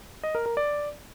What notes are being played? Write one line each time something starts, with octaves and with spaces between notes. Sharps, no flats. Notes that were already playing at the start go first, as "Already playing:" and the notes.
D#5
A#4
A#4
D5